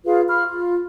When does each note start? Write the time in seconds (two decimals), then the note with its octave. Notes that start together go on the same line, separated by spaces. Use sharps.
0.05 F4 G#4 B4 F5
0.28 F5 B5 C#6 F6
0.47 F4